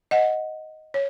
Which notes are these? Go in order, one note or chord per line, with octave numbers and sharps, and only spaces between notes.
D#5 F#5
C#5